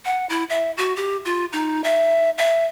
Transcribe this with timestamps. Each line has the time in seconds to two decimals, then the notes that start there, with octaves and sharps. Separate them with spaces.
0.05 F#5
0.29 E4
0.50 E5
0.77 F#4
0.96 G4
1.25 F4
1.53 D#4
1.84 E5
2.38 E5